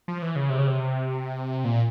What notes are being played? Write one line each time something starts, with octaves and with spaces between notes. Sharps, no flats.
F3
E3
C#3
C3
C#3
C3
A#2